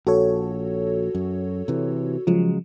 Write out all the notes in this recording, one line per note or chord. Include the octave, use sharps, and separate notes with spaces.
A#1 F#4 A4 C#5
F#2
C3 E3
C#3 F3 F#3 G#3